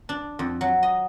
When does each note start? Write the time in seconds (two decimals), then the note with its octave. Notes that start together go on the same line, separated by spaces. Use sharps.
0.09 D4
0.39 F2
0.61 F#3
0.83 D#5